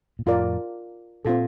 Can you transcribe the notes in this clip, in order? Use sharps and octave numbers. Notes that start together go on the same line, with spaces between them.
A#2
F2 A2 F4 A#4 D5
A#2 C4 F4 A4